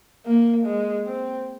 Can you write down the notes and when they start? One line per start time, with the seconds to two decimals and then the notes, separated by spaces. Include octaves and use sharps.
0.26 A#3
0.65 G#3
1.06 C4